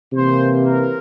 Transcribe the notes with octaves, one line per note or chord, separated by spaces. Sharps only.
C3 E3 A#3 C5
A#4